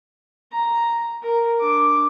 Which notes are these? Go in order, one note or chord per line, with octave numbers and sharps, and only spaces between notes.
A#5
A#4
D4 D6